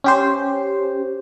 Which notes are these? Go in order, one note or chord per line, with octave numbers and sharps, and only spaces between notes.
C#4 G4 C5